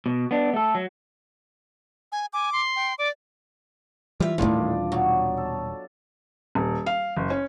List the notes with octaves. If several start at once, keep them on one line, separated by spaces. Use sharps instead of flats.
B2
B3 D4
A3 A4
F#3
G#5
G#5 D6
C6
G5
D5 D6
E3 G3 F4 E5
D#1 G#1 A2 D#3 E3 D4 F4 D5
B2 F#3
A4
D#1
F5
F#1
C#4